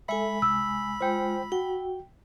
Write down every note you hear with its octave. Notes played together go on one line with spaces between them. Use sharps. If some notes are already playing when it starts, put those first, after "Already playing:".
G#3 A4 E5 G#5 B5
C2 E6
G#3 F4 C5 G5
F#4 G5